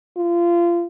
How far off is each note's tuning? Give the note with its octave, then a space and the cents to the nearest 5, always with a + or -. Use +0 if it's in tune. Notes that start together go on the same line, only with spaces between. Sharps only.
F4 -25